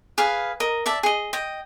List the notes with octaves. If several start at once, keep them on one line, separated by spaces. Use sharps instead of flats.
G#4 B4 F5
A#4 D#5
D5 E5 A5
G#4 D#5
D#5 G5